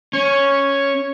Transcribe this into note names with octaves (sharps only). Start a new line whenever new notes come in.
C#4 C#5